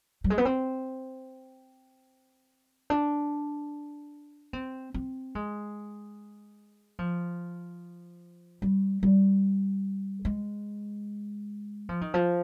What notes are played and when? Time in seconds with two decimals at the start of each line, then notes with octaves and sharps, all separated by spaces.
0.24 G3
0.30 G#3
0.38 B3
0.45 C4
2.90 D4
4.53 C4
4.94 C4
5.35 G#3
6.99 F3
8.62 G3
9.03 G3
10.25 G#3
11.89 F3
12.01 D#3
12.14 F3